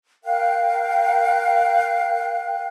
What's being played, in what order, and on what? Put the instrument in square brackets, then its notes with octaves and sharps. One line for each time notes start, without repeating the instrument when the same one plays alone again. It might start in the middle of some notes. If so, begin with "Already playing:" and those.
[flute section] A#4 F5 G5 F#6